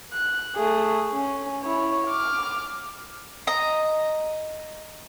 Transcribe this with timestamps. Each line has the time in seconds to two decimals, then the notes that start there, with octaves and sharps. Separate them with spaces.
0.13 F#6
0.56 A3 G#4
1.13 C#4
1.63 E4 C#5
2.08 D6 F6
3.47 D#5 A#5